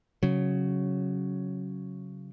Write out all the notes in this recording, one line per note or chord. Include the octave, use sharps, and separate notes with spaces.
C#3 F#3